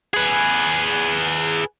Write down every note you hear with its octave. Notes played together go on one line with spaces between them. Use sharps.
G#4 B4